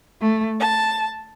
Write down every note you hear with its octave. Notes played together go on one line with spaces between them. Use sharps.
A3
A5